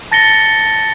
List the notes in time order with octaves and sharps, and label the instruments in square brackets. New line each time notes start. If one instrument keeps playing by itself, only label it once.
[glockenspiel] A5 A6 A#6 C#7 G7